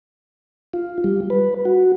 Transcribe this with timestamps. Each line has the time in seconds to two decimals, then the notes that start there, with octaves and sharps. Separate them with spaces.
0.73 F4
1.04 G3
1.30 B4
1.65 F#4